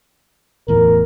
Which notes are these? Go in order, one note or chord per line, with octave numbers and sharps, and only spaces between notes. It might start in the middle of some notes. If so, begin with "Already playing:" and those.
D1 E2 A2 A#4